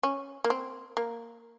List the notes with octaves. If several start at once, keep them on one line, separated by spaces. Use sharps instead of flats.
C#4
A#3
C4
A#3